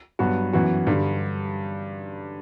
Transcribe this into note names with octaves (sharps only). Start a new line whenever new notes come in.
G2 F#3 B3 F#4
F#2 E3 B3 F#4
G2 D3 G3